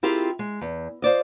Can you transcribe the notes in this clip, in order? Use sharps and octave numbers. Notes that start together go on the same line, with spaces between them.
C4 E4 F4 G4 G#4 A#4
G#3
E2
F4 C5 D5 D#5